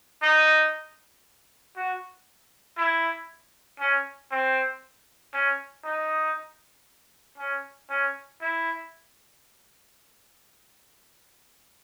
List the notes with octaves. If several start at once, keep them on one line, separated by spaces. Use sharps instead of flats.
D#4
F#4
E4
C#4
C4
C#4
D#4
C#4
C#4
E4